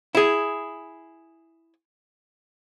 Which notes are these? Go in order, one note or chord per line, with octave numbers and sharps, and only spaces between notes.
E4 G#4